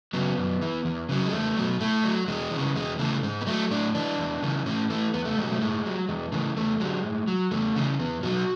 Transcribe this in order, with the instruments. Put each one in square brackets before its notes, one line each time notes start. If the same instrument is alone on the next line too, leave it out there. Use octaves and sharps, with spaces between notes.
[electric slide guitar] C#3 F#3 B3
F#2
E3
E2
C#3 F#3
G#3
E2 A3
B2 F#3
A2 A3
F#3
E2 G#3
C#3 E3
E2 G#3
C#3 E3 A3
G#2 G#3
B3
F#3 A3
A2 D4
E3 D4
E2
C#3 E3
A2 C#4
E3 A3
E2 B3
A3
B2 F#3 G#3
A3
A2 G#3
F#3
E2 G#3
C#3 E3 A3
E2 A3
D3 F#3 G#3
A2
F#3
E2 A3
C#3 E3
E2 B3
B2 F#3 F#4